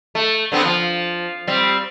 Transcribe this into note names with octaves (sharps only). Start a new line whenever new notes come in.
A3
D3 B3 C4
F3
G3 C4